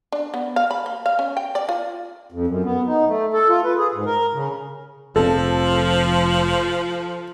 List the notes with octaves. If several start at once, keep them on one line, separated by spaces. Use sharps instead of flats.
D4
B3
F5
B5
A#3
F5
C#4
G5
D5
F4
F2
F#2
B3
D#4
A3
A4
F4
B4
G#4
G#2
A#4
C#3
F1 F3 C4 A4